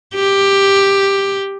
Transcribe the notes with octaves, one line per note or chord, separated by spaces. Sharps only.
G4